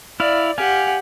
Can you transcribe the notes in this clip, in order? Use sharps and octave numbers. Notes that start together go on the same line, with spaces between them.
E4 D5 F5
G4 F5 F#5 G#5